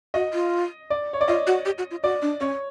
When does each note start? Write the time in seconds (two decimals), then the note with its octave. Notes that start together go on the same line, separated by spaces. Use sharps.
0.14 F#4 D#5
0.33 F4
0.90 D5
1.13 C#5
1.21 D5
1.28 F4 D#5
1.47 F#4
1.66 G4
1.78 F#4
1.91 F4
2.03 F#4 D5
2.22 D4
2.41 C#4 C#5